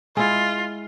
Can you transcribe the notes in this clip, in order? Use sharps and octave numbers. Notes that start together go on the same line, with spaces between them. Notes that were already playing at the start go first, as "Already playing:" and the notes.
G#3 E4 F4